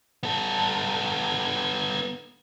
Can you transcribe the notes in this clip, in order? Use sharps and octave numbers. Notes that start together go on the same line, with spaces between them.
B3 A4